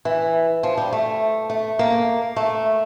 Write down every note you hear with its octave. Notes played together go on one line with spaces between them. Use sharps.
E3
F3
G3
A3
A3
A#3
A3